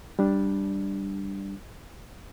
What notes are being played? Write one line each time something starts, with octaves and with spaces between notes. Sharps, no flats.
G3 D4